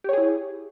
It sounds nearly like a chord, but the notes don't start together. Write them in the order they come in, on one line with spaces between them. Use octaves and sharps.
G4 C#5 G#4 E4